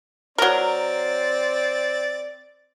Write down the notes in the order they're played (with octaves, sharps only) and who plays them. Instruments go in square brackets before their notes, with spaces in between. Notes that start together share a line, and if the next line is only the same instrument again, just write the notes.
[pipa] F#3 A#4 [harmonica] C4 D5